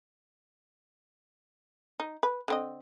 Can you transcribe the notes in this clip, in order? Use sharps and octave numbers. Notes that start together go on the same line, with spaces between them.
D#4
B4
D3 C4 D#5